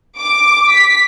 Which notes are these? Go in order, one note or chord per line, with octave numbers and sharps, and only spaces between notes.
D6
B6